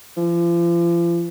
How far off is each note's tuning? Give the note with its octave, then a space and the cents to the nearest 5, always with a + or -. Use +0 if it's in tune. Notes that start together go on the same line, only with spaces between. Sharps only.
F3 -40